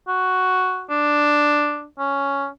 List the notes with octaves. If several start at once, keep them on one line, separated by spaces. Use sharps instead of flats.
F#4
D4
C#4